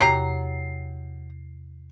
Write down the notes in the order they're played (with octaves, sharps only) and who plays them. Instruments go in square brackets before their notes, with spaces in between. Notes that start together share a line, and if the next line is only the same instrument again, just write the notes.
[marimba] E2 C3 [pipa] F#3 G4 A#5 [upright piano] C7